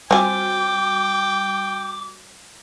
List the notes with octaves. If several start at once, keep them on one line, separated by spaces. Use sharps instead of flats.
G3 C4 F#4 G5 G#5 D6